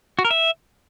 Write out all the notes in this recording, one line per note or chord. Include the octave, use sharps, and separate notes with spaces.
F#4
A#4
E5